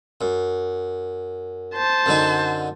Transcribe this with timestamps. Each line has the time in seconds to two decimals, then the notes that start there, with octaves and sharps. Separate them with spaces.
0.21 F#2
1.75 C5 A5
2.06 F#2 D3 D#4